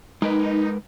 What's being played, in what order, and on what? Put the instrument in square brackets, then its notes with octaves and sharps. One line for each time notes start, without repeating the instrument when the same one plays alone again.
[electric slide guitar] G#3 A#4 B4 [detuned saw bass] D#4